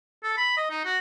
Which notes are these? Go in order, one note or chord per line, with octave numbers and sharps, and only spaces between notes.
A4
B5
D#5
D#4
F#4